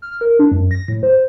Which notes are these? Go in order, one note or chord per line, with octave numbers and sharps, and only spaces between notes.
F6
A#4
D4
F#2
A#6
A2
C5